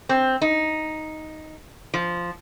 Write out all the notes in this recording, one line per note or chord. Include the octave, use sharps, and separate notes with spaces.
C4
D#4
F3